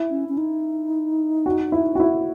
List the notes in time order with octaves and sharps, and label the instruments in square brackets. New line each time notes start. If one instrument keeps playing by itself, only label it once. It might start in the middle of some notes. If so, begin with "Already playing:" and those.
Already playing: [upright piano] E4
[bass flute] C#4
C#4
D#4
[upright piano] F#4
E4
F#4
E4